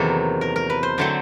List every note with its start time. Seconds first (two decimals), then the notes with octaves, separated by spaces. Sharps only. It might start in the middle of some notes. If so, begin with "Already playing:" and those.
Already playing: E2 C3 D#3 F#3 A#3 A4
0.41 A#4
0.56 A#4
0.70 B4
0.83 C5
0.98 D3 F#3 A3 C4